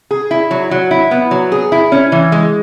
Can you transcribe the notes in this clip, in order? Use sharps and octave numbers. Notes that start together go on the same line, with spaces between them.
G#4
E4
F#3
F#3
E4
B3
F#3
G#4
E4
C#4
E3
G#3